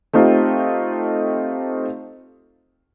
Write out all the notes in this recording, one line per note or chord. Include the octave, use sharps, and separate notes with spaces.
A3 C4 D#4 F4 G4